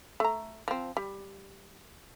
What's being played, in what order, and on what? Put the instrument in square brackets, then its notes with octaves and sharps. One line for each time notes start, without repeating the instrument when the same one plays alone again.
[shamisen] A3 A#5
F3 C4
G3